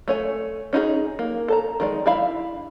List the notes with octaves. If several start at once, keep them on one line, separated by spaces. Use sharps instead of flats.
A3 C#5 G#5
C#4 D#4 E4 G#4
A#3
A4 A5 A#5
D#3 G#3 D5
D4 E4 E5 F5 B5